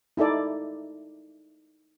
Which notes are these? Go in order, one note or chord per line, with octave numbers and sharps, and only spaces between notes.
D#4 E4 A4 D5